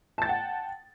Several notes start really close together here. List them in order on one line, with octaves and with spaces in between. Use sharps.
A5 A6 G5 F#5